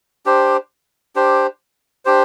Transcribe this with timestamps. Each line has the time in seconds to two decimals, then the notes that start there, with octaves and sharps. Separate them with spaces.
0.26 D4 G4 C5
1.16 D4 G4 C5
2.05 D4 G4 C5